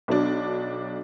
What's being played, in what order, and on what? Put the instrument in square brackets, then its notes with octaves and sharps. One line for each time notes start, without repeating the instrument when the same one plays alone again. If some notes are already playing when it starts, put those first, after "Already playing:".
[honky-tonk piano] B1 F#3 D4